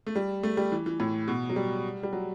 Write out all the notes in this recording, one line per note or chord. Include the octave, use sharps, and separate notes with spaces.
A3
G3
A3
G3
E3
E3
A2
B2
F#3
G3
G3
F#3